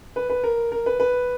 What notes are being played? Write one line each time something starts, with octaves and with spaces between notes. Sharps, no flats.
B4
B4
A#4
A#4
B4
B4